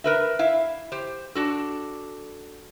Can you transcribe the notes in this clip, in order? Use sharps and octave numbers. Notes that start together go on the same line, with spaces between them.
A#4 B4 E5
E4 E5 F5
G4 C5
D4 F#4 A4